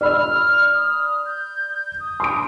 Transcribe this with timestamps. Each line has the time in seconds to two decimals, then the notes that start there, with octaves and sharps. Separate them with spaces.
0.01 D5 B5 E6 F6
0.74 D#6
1.25 G6
2.00 D#6
2.20 C6 D6 D7